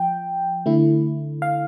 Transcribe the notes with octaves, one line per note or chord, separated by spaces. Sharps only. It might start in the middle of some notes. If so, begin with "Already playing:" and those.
Already playing: F3 G5
D3 A3 E4
F5